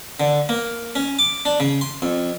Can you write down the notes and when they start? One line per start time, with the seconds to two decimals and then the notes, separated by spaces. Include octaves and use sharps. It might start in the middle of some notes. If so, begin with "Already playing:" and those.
0.20 D3
0.49 A#3
0.95 C#4
1.19 D6
1.45 D4
1.60 C#3
1.81 C6
2.02 F2